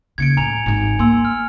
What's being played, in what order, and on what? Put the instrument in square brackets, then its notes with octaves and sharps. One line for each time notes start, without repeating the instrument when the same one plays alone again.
[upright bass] D#2 C#3 [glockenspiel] G#6 C#7 D7
[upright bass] A2 [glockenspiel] G#5 A#5 F7
[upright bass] G#1 D#4
[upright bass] A#3 [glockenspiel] G#5 C6 E6
[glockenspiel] F6